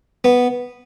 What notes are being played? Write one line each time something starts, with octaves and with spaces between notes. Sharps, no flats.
B3